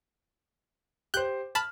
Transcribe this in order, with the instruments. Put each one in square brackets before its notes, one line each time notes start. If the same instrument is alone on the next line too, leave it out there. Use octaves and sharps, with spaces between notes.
[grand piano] G4 C5 [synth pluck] F#6 G6
[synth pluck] A5 B5 [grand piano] F6